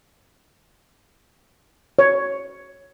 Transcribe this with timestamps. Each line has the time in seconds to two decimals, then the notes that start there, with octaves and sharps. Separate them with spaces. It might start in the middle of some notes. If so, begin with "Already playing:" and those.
1.99 C#5